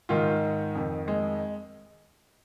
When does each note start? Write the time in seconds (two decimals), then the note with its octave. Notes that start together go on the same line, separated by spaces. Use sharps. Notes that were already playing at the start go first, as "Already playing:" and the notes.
0.09 G#2 D#3 F4
0.75 F2 D#3
1.08 G#3